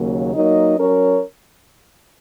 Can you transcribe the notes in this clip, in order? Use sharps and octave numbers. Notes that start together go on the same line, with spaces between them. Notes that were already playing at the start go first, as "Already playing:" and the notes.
Already playing: D#2 C#3 F#3 A#3
F#3 A#3 D#4 A#4 D#5
F#3 C#4 A#4 C#5